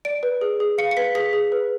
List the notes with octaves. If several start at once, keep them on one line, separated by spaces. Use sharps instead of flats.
D5 D7
B4
G#4
G#4
F5 C#7
C#7
B4 B6
G#4 B6
G#4
B4